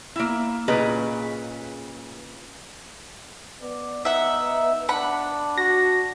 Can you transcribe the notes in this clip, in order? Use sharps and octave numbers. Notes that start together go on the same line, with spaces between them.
A#3 E4
A#2 C#3 G#4 B4 D#5 A#5
B3 D5
D#4 E5 F#5
D4 F#5 B5
F#4 A#6